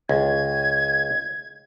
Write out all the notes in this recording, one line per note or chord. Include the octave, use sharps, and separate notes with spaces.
C#2 G#6